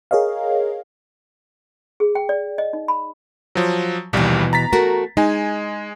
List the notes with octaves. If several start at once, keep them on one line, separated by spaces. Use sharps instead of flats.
G#4 A#4 C#5 D#5 F5
G#4
G5
D5
D#5
D#4
B5
F3 F#3
A#1 D#2 B2 E3 G3
A#5 A6 B6
A3 F#4 A#4
G#3 D#4 G#5